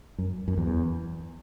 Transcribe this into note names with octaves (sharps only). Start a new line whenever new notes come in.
F#2
F#2
E2